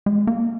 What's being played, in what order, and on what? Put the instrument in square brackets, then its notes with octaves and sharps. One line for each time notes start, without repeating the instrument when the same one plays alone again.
[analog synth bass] G#3
A#3